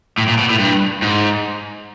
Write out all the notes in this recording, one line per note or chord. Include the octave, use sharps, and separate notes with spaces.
A2
A#2
B2
A2
G2
G#2